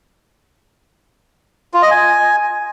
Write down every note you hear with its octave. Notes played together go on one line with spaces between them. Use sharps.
F4
D#5
G#5